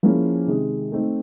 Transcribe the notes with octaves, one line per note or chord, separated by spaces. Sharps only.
F3 A#3 C#4 E4 G#4
C3 D#3 G#3
A3 C4 D#4